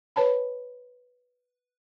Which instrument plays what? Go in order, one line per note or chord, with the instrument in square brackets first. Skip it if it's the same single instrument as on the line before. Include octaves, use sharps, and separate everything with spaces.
[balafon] B4 C#5 A5 B5